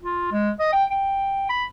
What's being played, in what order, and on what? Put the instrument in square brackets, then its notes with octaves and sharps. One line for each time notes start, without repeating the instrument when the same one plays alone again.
[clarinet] F4
G#3
D#5
G5
G5
B5